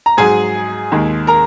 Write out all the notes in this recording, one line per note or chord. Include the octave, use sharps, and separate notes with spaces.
A#5
G#2 F#3 G#4 G#5
D#2 D#3 G#3
A#4 A#5